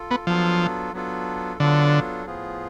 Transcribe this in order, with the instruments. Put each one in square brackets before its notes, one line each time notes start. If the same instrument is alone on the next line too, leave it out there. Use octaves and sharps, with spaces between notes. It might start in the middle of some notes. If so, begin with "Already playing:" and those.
Already playing: [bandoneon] F4 A4
[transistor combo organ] B3
[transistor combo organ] F3 [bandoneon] F#3 B3 D4 F4 A4
[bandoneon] F#3 B3 D4 F4 A4
[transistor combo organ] D3 [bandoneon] F#3 B3 D4 F4 A4
[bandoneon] A2 F3 B3 F4 G#4